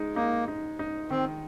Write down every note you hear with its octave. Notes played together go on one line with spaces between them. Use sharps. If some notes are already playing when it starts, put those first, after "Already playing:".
Already playing: G#3 D#4
A#3 D#4
D#4
D#4
D#3 C4